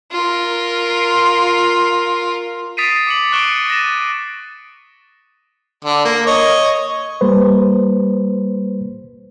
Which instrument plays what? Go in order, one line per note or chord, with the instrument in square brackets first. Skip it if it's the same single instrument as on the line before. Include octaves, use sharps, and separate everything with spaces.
[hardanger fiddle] F4 A#4
[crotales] D#6 A6 B6 C7 D7 D#7
D6 C#7 F#7
C#6 F#6 C#7 D7 E7 G7
A6 A#6 D#7 E7
[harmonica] D3
A#3
C#5 D#5
[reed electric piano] G3 A#3 B4 C5